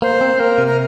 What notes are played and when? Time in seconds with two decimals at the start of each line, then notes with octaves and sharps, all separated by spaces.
0.02 A#3 C5
0.21 C4
0.40 A#3 A#4
0.58 C3
0.67 A#4